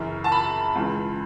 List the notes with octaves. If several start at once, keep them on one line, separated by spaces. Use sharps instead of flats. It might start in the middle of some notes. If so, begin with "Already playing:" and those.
Already playing: F#2 C#3 E3
A5
B5
C#2 C#3 E3